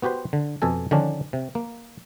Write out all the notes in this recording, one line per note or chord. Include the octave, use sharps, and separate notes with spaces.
B3 F#4 G4 B4 C5
D3
F2 B2 A4 G#5
D3 D#3 F3 C#4 D4
C3
A#3